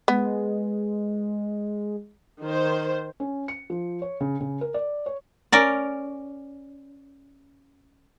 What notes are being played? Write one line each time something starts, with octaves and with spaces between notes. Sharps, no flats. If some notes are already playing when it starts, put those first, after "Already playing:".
G#3 B3
D#3 C5
C#4
C#7
F3
C#5
C#3
C#3
A#4
D5
C#5
C#4 A#4 D5